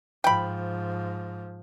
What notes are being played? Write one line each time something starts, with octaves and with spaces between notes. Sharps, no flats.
G#2 F3 G5 B5